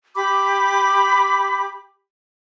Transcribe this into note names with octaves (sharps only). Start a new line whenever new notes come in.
G4 B5 D6